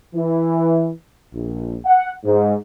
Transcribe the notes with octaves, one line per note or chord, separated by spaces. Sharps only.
E3
A#1
F#5
G#2